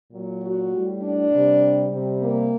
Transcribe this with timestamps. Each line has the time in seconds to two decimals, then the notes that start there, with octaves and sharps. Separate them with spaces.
0.11 A#2 F#3
0.41 F#4
0.70 A2 G3
1.01 D4
1.31 C3 G3
1.90 C3 G3
2.20 A#3